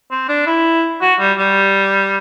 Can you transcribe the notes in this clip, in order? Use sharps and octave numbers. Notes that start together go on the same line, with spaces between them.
C4
D4
E4
F#4
G3
G3